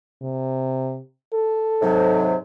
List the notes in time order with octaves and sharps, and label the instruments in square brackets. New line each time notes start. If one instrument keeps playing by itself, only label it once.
[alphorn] C3
A4
[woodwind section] G#2 C3 F#3